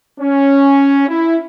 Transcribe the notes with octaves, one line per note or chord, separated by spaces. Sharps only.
C#4
E4